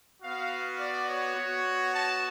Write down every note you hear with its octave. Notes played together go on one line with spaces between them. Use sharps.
B3 F#4 F5
D5
C#5
B3 F#4
A5